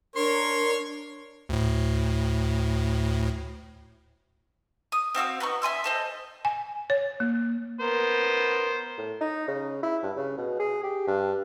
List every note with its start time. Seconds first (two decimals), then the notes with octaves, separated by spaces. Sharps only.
0.16 D4 A#4 C#5 C6
1.49 D2 A2
4.92 D#6
5.15 C4 F#4 F5 E6
5.40 B3 D#4 A#5 C#6
5.62 E5 G#5 C6 E6
5.84 A4 C5 D#5
6.45 G#5
6.90 C#5
7.20 A#3
7.79 B3 A#4 C5
8.98 A2
9.21 D#4
9.48 C#3
9.83 E4
10.03 G2
10.16 C#3
10.38 B2
10.60 G#4
10.83 G4
11.07 G2